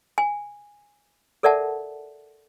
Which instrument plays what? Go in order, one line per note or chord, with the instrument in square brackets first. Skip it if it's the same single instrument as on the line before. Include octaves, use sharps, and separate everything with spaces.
[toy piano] G#5
A4 A#4 D5 E5 F#5 A5